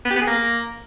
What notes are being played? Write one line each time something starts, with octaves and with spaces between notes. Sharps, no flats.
B3
G4
B3
G#4
A#3